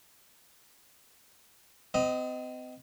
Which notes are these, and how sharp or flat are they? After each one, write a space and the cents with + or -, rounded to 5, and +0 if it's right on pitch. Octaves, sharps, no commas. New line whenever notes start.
C4 -40 D#5 +0